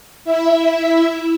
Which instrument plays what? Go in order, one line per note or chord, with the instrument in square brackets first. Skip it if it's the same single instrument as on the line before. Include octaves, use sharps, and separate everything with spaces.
[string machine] E4 E5